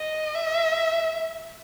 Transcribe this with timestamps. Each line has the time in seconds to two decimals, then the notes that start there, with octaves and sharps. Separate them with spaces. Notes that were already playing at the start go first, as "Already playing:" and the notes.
Already playing: D#5
0.35 E5